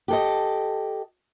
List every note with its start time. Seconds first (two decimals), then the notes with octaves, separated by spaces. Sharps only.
0.08 G4 A4 D#5